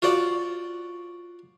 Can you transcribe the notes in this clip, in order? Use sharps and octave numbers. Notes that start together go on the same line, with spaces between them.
F4 F#4 C5 D5